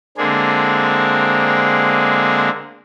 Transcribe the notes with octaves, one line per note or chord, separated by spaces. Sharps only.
D3 G#3 A#3 C4 D4 G#4